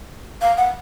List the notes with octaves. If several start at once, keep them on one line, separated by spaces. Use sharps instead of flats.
F5
F#5